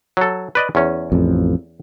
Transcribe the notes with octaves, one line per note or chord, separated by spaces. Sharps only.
F#3 A4
B4 D5 D#5
E2 C#4
A1 F2